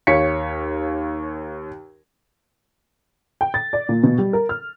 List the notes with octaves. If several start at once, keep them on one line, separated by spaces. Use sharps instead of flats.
D#2 C#5 F5 B6 C#7
G5
A6
D5
A#2
B2
G3
A#4
F6